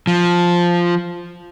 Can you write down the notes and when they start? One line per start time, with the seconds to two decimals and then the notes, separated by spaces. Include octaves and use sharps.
0.07 F3